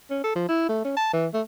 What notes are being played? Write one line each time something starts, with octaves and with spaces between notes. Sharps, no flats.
C#4
A4
F3
E4
A3
C#4
A5
E3
A3